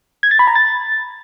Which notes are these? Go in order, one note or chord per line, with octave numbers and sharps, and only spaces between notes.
G#6
A6
B5
A#5
A6